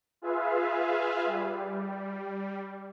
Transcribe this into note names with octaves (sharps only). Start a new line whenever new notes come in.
F4 G#4 B4 E5 F5
G3